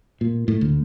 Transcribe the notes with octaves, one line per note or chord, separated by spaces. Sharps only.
A#2
A2
D2